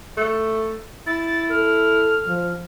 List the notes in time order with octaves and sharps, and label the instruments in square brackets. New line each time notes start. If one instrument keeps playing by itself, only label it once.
[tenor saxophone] A3
[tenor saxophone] E4 [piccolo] A6
[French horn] A4 [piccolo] F6
[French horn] F3